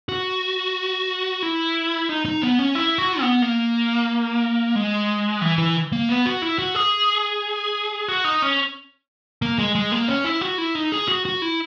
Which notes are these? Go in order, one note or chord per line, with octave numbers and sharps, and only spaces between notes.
F#4
E4
D#4
D#4
B3
C#4
E4
F#4
B3
A#3
G#3
E3
E3
A#3
B3
F#4
E4
F#4
G#4
F#4
D#4
C#4
A#3
G#3
G#3
A#3
C#4
E4
F#4
E4
D#4
G#4
F#4
F#4
E4